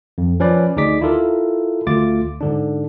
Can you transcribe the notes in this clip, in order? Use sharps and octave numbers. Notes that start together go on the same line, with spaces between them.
F2
F3 C#4 B4 D5
D2 D#4 G#4 D5 D6 B6
E4 F4 A4 A#4
D2 A3 F4 D6 A6
G#2 D3 D4